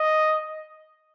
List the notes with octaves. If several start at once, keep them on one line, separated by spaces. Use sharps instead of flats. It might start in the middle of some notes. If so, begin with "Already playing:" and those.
Already playing: D#5